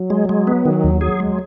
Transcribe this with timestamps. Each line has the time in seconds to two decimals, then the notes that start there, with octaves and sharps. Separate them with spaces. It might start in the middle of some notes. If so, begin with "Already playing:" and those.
Already playing: F#3
0.10 G#3
0.29 G#3
0.47 B3
0.65 D#3 F#3
0.84 D#2
1.01 F#3 G#4
1.20 G#3